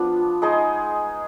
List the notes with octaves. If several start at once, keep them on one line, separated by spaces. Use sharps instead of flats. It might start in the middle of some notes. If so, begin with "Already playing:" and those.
Already playing: F3 B3 D4
G#3 D#4 G#4 D#5